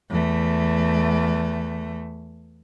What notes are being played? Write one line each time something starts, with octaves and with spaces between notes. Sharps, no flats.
E2 A3